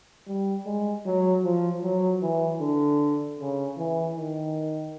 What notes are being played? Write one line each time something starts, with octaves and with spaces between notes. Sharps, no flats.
G3
G#3
F#3
F3
F#3
E3
D3
C#3
E3
D#3